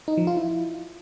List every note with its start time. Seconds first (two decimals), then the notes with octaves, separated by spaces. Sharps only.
0.08 D#4
0.17 F3
0.27 F4
0.37 E4